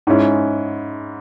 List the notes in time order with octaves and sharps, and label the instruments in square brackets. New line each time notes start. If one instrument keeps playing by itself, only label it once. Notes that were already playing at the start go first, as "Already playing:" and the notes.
[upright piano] G#2 G#3 C#4 E4